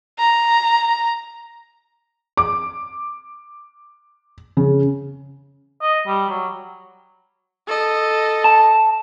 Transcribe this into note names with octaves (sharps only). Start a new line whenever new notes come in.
A#5
D6
C#3
D#5
G3
F#3
A4 D#5
A5